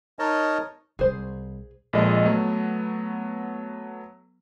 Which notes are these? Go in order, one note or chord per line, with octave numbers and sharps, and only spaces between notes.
D#4 A#4 C#5 D#5 A5
C2 G#4 C5
A#1 A#2 G#3 A4 D#5
F#3 A3 B3